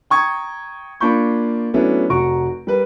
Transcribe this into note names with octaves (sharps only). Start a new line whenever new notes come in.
G5 A#5 C#6 D#6 G#6
A#3 D4 F4 B5 C#6 G6
F#3 A3 B3 C#4 D4 E4
F1 F#4 A#5 C#6 D7
G3 A#4 B4